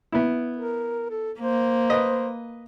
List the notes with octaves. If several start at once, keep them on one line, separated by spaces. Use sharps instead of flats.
B3 E4
A#4
A4
A#3 C5
B4 D#5